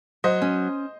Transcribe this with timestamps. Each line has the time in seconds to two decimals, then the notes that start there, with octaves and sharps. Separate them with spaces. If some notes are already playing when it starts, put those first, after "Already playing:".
0.24 F#3 C5 D#5
0.42 C#4